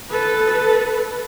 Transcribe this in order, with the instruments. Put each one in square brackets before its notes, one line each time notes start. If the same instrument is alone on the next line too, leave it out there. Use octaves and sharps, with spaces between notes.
[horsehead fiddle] A4 B4